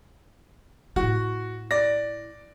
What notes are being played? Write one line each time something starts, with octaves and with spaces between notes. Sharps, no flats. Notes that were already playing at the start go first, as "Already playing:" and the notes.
A2 E4 F#4
D5 A#6